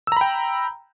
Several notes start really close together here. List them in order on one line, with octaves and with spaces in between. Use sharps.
E6 A#5 B5 G5